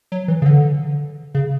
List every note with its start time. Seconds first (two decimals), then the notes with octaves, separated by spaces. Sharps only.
0.12 F#3
0.28 E3
0.42 C#3
0.46 D3
1.35 C#3